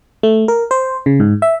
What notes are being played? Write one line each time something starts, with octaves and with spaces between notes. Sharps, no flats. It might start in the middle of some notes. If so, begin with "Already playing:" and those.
A3
A#4
C5
C#3
G#2
E5